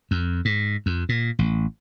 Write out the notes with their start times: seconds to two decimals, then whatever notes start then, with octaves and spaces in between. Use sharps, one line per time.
0.11 F2
0.45 G#2
0.86 F2
1.09 A#2
1.39 A1